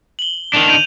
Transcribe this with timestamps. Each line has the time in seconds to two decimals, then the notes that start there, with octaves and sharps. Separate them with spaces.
0.19 F#7 G7
0.54 D#3 D4 F7
0.67 G6 D#7 F7